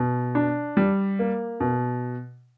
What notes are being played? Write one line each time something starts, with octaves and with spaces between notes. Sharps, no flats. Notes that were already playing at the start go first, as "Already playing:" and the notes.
Already playing: B2
D4
G3
A#3
B2